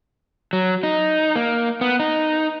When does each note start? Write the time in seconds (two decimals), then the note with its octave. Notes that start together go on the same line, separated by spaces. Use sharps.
0.53 F#3
0.83 D#4
1.35 A#3
1.81 B3
2.00 D#4